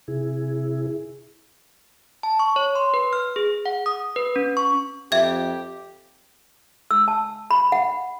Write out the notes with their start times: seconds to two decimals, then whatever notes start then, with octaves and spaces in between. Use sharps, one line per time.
0.08 C3 E4 G#4
2.23 A5
2.39 C#6
2.56 C#5
2.75 C6
2.94 B4
3.13 F6
3.36 G#4
3.66 F#5
3.86 D#6
4.16 B4
4.36 C#4
4.57 C#6
5.12 F2 G4 E5 G#6
6.91 E6
7.08 A5
7.51 B5
7.72 F#5